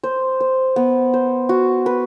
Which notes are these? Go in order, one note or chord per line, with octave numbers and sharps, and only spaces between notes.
C5
C5
B3
C5
F#4
B4